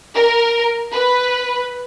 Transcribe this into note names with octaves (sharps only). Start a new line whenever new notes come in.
A#4
B4